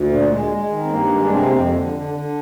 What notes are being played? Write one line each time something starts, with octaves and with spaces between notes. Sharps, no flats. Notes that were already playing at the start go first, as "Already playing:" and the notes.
Already playing: D2
A#2
G#3
G#3
D#3
C4
G2 A#3
G#3
D4
C3 C4
A#3
F2 C4
D3
D3
D3